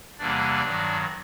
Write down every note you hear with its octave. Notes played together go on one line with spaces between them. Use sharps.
E2 C3 E3 G3 A#3 D4 D5
G2 D#3 F#3